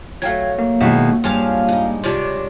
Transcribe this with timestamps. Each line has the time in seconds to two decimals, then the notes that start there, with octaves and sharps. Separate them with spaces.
0.22 F#3 A3 F5 G5 G#6
0.58 A#3
0.81 B2 D#3 G#3 E4
1.24 G2 F3 G#4 C#5 F5 G#5 A5
1.69 G#3 D#4
2.04 C3 D4 F4 C#5 D5